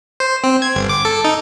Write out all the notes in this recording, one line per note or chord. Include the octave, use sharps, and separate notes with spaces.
C5
C4
G#6
G1
D6
A4
D#4